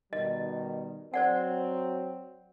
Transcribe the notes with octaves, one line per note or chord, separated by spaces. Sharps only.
B2 D#3 G3 D#5
F#3 C4 C5 D5 F#5